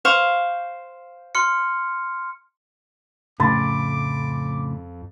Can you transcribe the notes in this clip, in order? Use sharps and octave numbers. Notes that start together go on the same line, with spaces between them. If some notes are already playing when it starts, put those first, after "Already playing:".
C5 F5 C#6
C6 F6 C#7
F2 A2 C#3 B5 C6 D6 A6